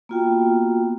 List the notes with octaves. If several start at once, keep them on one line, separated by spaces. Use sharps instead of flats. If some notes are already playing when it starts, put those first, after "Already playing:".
A#3 B3 F4 F#4 G5